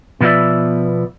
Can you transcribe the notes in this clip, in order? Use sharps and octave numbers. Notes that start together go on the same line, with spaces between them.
B2 F3 B3 D5 E5